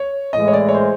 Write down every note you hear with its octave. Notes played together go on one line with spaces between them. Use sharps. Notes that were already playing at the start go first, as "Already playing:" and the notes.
Already playing: C#5
A2 E3 G#3 D#5
C#5
D5
C#5
C5